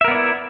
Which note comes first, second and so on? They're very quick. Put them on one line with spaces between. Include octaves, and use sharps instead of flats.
E5 A#4 B3 D5 E4